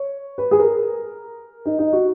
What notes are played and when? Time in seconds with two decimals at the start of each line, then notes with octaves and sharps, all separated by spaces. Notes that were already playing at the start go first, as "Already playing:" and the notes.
Already playing: C#5
0.38 B4
0.51 G#4
0.59 A#4
1.66 D#4
1.79 D#4
1.93 F#4